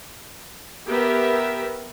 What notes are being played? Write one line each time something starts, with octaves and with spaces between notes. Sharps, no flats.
B3 G4 A#4 E5